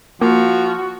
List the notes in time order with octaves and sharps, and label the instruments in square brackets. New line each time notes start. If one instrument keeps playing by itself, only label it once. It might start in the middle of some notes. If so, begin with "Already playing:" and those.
[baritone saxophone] F3 [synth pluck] A#3 [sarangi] F#4